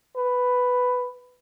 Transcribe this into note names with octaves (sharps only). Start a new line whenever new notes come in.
B4